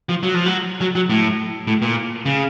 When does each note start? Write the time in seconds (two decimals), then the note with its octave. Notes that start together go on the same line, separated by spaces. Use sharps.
0.09 F3
0.23 F#3
0.34 F3
0.46 F#3
0.81 F#3
0.95 F#3
1.10 A2
1.67 A2
1.82 A#2
2.26 C#3